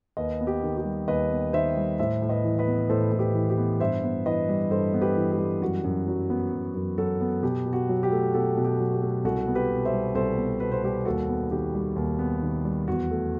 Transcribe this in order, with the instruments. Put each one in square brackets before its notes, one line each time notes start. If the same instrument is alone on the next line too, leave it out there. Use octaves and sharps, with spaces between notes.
[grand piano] D#2 B4 D#5
B3
G4
D#3
G4
G3
D#2 B4 D#5
B3
D#3 C5 E5
G3
A2 C5 E5
A2
B4 D#5
E3
B4 D#5
B3
A2 A4 C5
A2
G4 B4
E3
G4
B3
G2 C5 E5
B3
E3 B4 D#5
G3
G2 A4 C5
B3
G4 B4
E3
G4
G3
F#2 F#4
F#2
F#3
B3
F#2
F#2
F#3 F#4 A4
B3
B2 G4
B2
F#4
F#3
G4
A3
B2 F#4 A4
B2
G4
F#3
G4
A3
C2 F#4 A4
B3
G4 B4
B2
C5 E5
G3
C2 A4 C5
B3
B2 B4
C5
G3 G4 B4
D#2 F#4 A4
B3
D#3 G4
G3
D#2
B3
D#3
G3
E2 F#4
A3